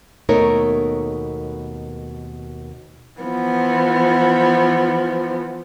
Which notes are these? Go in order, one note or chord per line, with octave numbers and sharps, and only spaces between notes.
D#2 B2 A3 D#4 A#4 C#5
E3 F3 B3